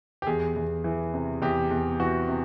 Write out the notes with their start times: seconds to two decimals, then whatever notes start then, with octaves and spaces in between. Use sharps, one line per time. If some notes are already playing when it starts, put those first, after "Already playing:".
0.22 G4
0.27 E2 G#4
0.56 E2
0.84 E3
1.14 C3
1.42 E2 G4
1.71 E2
1.99 E3 F#4
2.29 C3